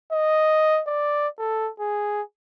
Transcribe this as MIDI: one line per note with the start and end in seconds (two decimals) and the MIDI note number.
0.12 0.82 75
0.87 1.28 74
1.38 1.70 69
1.80 2.22 68